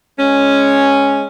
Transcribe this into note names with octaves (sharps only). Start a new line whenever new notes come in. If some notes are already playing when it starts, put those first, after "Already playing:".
G#3 C#4